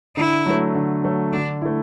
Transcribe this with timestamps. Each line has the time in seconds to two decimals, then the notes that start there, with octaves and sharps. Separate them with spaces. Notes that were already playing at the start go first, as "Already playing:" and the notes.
0.17 D3 E4
0.46 F#3 A3
0.75 D3
1.04 F#3 A3
1.33 D3 D4
1.62 A3 E4